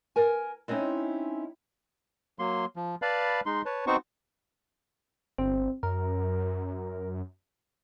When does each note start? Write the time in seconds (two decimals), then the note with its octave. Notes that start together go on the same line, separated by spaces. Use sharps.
0.16 A#4 G#5
0.68 G#3 C4 C#4 D#4 E4
2.39 F#3 A#3 C6
2.76 F3
3.02 B4 D5 F5 A5 B5
3.46 G#3 D#4 C6
3.65 B4 C#5 A5
3.87 B3 C4 D#4 F#4 C5 C#6
5.38 G1 C4
5.83 F#2 A#4